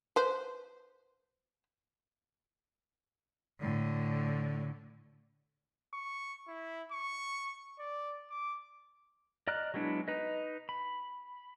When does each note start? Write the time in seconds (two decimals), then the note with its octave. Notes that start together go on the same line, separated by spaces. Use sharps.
0.16 B4 C5
3.61 A2 D3
5.93 C#6
6.48 E4
6.92 C#6
7.79 D5
8.30 D6
9.48 D5 D#5 A#5 F6 F#6
9.74 F#3 G#3 B3 D4 E4
10.08 D#4 B4 D#5
10.69 B5